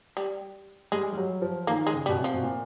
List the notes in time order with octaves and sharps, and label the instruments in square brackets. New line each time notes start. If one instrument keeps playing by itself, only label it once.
[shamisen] G3
[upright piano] G3 [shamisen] G#3
[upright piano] G3
F#3
F3
[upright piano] D#3 [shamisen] A#3
[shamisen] G#3
[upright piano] C#3
[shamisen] G3
[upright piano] B2
C3
[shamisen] F3
[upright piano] B2
A#2